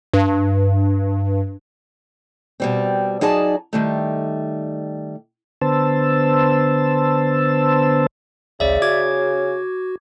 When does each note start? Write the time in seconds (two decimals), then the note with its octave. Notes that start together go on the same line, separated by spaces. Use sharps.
0.14 G2
2.60 B2 G3 C4
3.21 F#3 D#4 G#4 D5 A5
3.73 D#3 G3 A3
5.61 D3 B3 C5 A5 E6
8.60 A1 D2 C#3 D5 E5
8.82 F#4 D6 G#6